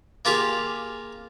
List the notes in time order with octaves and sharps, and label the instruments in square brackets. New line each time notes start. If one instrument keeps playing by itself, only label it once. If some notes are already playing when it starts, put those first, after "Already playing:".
[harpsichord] A#3 F4 G4 G#4